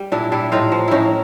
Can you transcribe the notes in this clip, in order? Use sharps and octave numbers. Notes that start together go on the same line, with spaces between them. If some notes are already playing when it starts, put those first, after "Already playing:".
Already playing: G3
A#2 D4 E4
G3 D4 E4
A2 D#4 F4
F3
A2 C#4 D#4 E4